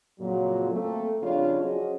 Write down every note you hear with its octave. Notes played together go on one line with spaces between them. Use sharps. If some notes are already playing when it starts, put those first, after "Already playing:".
F2 A#2 C#3 F#3
A3 A#3 C4 A4
F2 C#3 G3 D4 F4 C#5
F#3 C#4 F#4 G#4 C5 D#5